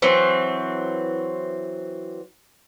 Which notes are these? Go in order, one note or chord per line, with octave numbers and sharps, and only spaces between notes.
E3 F#3 C4